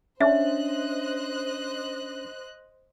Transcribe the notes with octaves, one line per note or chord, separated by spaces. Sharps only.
C#4 D4 C5 D#5 E5 F#6